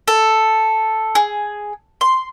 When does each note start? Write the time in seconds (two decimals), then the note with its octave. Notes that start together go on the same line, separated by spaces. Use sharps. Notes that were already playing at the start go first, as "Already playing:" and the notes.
0.08 A4
1.15 G#4
2.01 C6